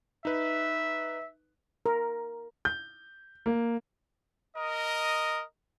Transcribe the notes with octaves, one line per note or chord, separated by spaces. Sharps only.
D#4 B4 E5
A#4
G6
A#3
A#4 D#5